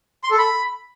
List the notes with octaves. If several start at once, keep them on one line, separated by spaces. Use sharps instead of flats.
C6
A4
B5